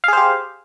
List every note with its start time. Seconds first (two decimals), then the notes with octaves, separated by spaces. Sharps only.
0.04 F5
0.08 G#4
0.13 C5
0.17 G4